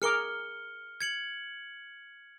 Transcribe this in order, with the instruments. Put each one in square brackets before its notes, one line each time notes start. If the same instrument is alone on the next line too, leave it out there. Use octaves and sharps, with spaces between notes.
[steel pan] G#4 A#4 D6 [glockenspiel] F6 C#7 G7
[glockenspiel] G#6 C#7 F#7